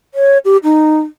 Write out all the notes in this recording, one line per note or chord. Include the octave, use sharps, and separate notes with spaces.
C#5
G4
D#4